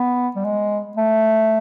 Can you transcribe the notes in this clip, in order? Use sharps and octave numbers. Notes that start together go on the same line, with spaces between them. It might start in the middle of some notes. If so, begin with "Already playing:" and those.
Already playing: B3
G3
G#3
A3